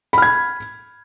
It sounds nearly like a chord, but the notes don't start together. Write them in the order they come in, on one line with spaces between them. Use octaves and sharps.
B5 F6 G#6